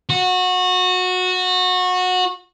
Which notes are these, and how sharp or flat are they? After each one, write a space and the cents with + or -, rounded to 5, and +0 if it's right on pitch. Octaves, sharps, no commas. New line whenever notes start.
F#4 -20